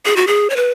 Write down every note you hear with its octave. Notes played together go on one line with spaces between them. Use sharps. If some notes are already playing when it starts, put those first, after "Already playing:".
G#4
F#4
G#4
C#5
B4